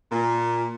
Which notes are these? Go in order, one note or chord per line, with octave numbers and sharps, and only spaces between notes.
A#2